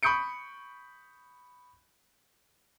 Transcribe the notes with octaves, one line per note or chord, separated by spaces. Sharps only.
B5 C#6 D#6 G6 C#7 D7